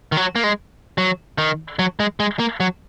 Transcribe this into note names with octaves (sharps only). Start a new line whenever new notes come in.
D#3
F#3
A#3
G#3
F#3
D#3
F#3
G#3
G#3
A#3
F#3